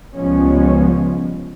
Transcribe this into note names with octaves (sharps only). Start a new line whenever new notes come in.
C#2 F3 G3 G#3 B3 C#4